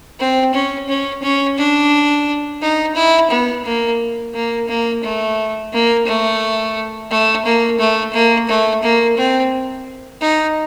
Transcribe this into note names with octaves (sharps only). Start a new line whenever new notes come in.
C4
C#4
C#4
C#4
D4
D#4
E4
B3
A#3
A#3
A#3
A3
A#3
A3
A3
A#3
A3
A#3
A3
A#3
C4
D#4